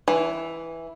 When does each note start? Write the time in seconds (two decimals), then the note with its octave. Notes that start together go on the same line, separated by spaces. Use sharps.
0.08 E3